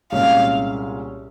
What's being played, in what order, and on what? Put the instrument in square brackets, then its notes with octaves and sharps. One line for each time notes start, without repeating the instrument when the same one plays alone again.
[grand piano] C2 A#2 G#3 C#4 G#4 [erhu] F5